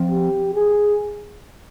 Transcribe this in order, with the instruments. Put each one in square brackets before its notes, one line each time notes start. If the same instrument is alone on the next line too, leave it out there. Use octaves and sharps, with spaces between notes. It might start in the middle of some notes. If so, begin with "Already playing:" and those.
Already playing: [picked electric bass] F3 C4
[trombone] G4
G#4